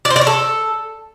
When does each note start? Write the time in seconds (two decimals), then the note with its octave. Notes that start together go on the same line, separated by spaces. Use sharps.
0.05 D5
0.10 C5
0.16 D5
0.21 C#5
0.27 A4